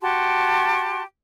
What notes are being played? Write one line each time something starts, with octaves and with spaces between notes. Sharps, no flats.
F#4 G4 A5 C6